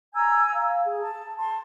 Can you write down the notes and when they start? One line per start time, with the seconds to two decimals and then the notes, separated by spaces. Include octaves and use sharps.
0.13 G#5 A#5 E6 G#6
0.53 F5
0.83 G#4
0.99 A5
1.37 A5 C6